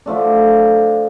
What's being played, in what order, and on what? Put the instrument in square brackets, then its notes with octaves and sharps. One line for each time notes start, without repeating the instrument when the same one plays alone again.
[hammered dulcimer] D3 F3 A3 D4